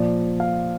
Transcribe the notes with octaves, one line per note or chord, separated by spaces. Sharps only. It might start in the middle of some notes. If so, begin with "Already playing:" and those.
Already playing: A#2 F3 D5
F5